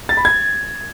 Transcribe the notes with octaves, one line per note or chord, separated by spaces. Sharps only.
A6
B5
G#6